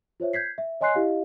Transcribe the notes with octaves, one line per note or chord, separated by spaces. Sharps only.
F4 C5 C#5 E5
G6 G#6 B6 C7
E5
C#5 D#5 G#5 C6 F#6 C7
E4 G4 D#5 F5